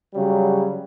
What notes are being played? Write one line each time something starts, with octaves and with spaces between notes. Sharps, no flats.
C#3 F#3 G3